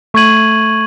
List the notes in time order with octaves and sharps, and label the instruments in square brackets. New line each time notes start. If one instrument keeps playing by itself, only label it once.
[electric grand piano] A3 [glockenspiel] C#6 G#6 D#7 F#7